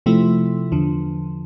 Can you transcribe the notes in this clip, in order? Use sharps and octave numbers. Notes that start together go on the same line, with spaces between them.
C3 F3 A3 E4
E2 D3 F3